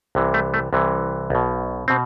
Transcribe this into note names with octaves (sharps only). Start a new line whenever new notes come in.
C2 C3 E3
A3
A3
C2 C3 E3
B1 B2
B2 C4